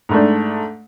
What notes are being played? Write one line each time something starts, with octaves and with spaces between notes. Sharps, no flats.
G#2 A3 D4